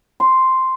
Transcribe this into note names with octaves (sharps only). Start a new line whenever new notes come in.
C6